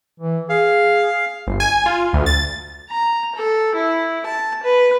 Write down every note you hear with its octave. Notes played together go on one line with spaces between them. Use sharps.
E3
G#4 F5
G1
G#5
F4
D2
A6
A#5
A4
E4
A5
B4